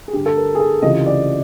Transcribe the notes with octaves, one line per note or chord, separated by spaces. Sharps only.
G#4
G2 D3 G4
A4
A#4
G#4
A4
C#2 C3 E3 D#5
D5